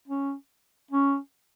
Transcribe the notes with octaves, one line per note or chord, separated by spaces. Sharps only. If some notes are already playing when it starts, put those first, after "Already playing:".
C#4
C#4